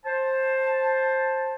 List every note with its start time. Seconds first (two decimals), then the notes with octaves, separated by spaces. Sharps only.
0.05 C5 A5